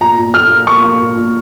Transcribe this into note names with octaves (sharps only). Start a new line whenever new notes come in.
A#2 A#5
A#2
A#2 F6
A#3
A#3 C#6
A#3
A#2
A#2